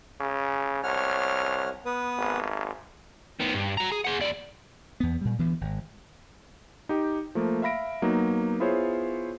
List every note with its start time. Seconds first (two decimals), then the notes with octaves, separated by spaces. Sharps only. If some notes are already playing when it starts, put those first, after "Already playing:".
0.20 C#3
0.83 C2 C#5 F#5 F6
1.86 B3 B4 D#6
2.18 G#1
3.40 D#3 B3
3.55 G2
3.77 F#4 A#5
3.92 G#4
4.04 G#4 F#5
4.20 D#2 D5
5.00 E2 B3
5.21 A#2 G3
5.39 D2 E3 B3
5.61 G#1
6.89 D#4 G4 G5
7.35 F3 A3 A#3
7.62 E5 F5 B5 A#6 D7
8.02 F#3 A#3 B3 D#4
8.60 B3 E4 F4 G#4 C5 C#5